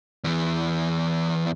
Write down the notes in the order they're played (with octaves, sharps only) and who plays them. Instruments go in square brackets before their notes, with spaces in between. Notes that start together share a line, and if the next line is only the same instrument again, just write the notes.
[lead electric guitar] E2 E3